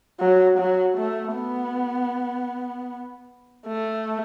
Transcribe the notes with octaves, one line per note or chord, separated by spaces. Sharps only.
F#3
F#3
A3
B3
A3